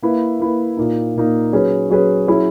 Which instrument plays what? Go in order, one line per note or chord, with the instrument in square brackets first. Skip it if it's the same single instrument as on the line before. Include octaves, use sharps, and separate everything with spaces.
[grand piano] A#3 E4 B4
A#3 E4 B4
A#2 A#3 D#4
A#2 A#3 D#4
F#3 C#4 G#4 B4
F#3 C#4 G#4 B4
F#3 C#4 E4 G#4